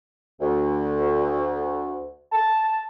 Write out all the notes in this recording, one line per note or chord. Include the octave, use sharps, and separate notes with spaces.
D2
A5